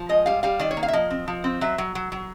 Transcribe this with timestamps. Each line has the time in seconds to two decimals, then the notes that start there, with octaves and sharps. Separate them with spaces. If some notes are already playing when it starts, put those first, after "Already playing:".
Already playing: F3
0.09 G#3 D#5
0.26 G3 F5
0.43 G3 F5
0.59 D#3 D5
0.71 C#5
0.77 A#3
0.83 F5
0.88 E5
0.93 F3 D#5
1.10 C4
1.28 F3
1.44 C4
1.61 F#3 E5
1.78 F#3
1.95 F#3
2.12 F#3